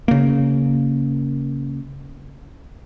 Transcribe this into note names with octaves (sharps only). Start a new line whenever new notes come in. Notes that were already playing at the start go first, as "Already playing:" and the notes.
C#3 A#3